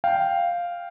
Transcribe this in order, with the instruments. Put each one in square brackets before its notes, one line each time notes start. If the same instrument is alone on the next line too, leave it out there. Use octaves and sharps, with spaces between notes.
[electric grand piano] F5 G5